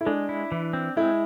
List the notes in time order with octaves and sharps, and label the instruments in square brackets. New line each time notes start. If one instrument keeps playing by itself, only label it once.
[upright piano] E4
[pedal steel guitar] G#3 [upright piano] D4
[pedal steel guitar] E4
E3
C4
[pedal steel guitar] G#3 [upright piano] E4